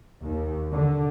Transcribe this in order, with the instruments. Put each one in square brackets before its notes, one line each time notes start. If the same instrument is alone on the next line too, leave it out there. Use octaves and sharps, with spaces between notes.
[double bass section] D#2
D3